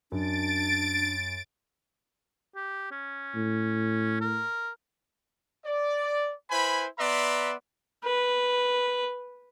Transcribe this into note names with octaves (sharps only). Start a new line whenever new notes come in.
F#2 D4 A6 D7
G4
C#4
A2
A#4
D5
E4 B4 C5 G#5 B5
B3 B4 D5 E5 A#5 C6
B4